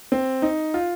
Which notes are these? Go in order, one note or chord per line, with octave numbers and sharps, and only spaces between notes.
C4
D#4
F4